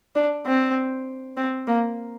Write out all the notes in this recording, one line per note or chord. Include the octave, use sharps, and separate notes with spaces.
D4
C4
C4
A#3